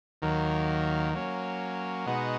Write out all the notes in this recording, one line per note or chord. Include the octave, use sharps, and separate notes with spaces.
D#2 D#3 F#3 A#3
F#3 A#3 C#4
B2 G#3 B3 D#4 F#4